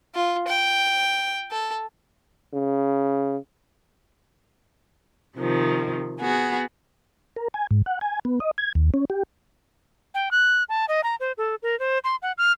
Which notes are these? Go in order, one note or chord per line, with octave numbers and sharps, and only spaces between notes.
F4
G5
A4
C#3
C3 D#3 F3
B3 F#4 G#4
A#4
G#5
G#2
F#5
G#5
B3
D#5
G#6
D#2
C#4
G4
G5
F#6
A5
D#5
A#5
C5
A4
A#4
C5
C6
F#5
F6